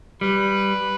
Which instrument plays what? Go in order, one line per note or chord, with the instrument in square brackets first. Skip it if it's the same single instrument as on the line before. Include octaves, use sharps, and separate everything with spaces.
[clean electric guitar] G3 [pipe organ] B4